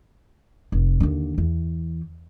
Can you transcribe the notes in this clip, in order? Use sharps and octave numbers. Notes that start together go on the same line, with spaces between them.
F1
D#2 D3
E2